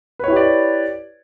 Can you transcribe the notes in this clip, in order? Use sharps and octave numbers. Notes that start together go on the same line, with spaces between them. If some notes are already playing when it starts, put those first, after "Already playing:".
E4 G4 B4 C#5 D5